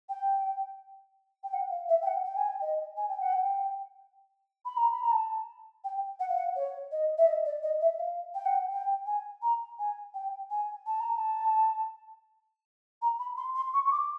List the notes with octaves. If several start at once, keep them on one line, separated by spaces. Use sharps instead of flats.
G5
G5
F#5
F5
E5
G5
F#5
G5
G#5
G5
D#5
G#5
G5
F#5
G5
B5
A#5
B5
A#5
A5
G5
F#5
F5
F#5
C#5
D#5
E5
D#5
D5
D#5
E5
F5
G5
F#5
G5
G5
G#5
A#5
G#5
G5
G#5
A5
A#5
A5
A#5
B5
C6
C6
C#6
C#6
D6